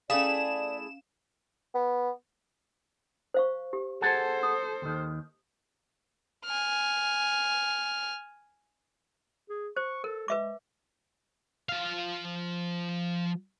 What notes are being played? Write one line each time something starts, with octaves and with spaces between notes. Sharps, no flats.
A3 C#4 E4 G#4 D5 F5 E7
B3
C5 F5 C#6
G4
G#4 A4 C5 F#5 A5
D#6
D#2 D#3
G#5 F6
G#4
C5 C#6
A4 A#4
G#3 B4 E5 D6
F3 F5